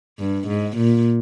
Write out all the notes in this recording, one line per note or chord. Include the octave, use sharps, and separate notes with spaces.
G2
G#2
A#2